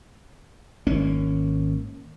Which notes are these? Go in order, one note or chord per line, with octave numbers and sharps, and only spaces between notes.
G#1 A#3 C#4